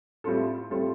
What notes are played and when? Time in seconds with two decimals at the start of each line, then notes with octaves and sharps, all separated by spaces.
0.24 A2 G3 C4 F4 A4
0.70 A2 G3 C4 F4 A4